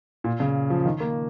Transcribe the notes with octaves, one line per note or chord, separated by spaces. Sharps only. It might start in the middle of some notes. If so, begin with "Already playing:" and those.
A#2
C#3
F3
D#3
A#3